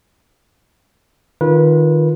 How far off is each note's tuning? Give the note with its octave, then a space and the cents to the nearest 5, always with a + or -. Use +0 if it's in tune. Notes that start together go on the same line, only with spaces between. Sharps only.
D#3 -20 F4 +0 B4 -25